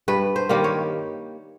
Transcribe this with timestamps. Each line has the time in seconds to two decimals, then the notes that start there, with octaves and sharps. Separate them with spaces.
0.08 G2 B4
0.36 C5
0.49 D#3 G3 A#3
0.64 C#5